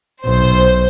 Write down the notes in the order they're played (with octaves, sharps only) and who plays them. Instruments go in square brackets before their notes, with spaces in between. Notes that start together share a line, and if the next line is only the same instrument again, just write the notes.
[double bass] B1 [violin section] C5